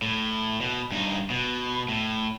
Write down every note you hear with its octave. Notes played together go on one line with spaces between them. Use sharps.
A2
B2
G2 D#4
B2
A2